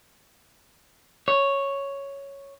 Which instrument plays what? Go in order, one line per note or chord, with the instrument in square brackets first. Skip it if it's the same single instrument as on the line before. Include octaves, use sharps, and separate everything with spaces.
[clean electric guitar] C#5